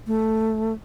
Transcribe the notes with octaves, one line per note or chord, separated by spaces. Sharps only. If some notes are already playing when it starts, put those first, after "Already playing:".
A3